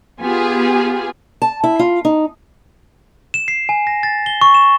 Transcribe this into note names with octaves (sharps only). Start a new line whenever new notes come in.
B3 F4 G4 G#4 G#5
A5
E4
F4
D#4
E7
C7
G#5
A#6
A6
G7
C#6
E7